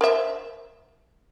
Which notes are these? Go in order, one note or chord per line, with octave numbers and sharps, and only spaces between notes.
A#4 C5 E5